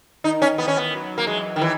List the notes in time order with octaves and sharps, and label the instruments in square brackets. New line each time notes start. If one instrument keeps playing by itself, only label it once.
[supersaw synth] D#3 [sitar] D#4
[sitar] C#4
[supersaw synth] E3 [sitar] B3
[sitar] C#4
B3
[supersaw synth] F#3
[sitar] A#3
[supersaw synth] E3 [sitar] G#3
[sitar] D#3
E3